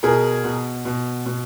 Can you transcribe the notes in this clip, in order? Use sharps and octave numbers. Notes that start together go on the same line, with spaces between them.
B2 G#4 A#4
B2
B2
B2